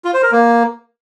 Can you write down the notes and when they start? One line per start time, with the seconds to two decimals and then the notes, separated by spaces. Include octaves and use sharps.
0.05 F4
0.14 C5
0.23 A#4
0.32 A#3